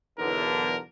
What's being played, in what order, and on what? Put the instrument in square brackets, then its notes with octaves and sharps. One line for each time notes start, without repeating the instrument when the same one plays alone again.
[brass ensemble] B1 E2 D3 [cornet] A#4